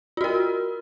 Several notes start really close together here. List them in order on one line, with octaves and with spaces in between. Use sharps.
F4 F#4 A#4